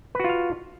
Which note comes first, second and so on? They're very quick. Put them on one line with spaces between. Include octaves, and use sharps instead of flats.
B4 F#4 F4 F5